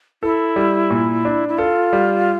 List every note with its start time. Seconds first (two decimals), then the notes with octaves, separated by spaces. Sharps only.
0.23 E4 A4
0.56 G3
0.90 A#2
1.25 D4
1.49 E4
1.58 F4 A4
1.93 G3